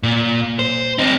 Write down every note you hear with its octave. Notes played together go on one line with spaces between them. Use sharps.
A#2
C5
C4 D#4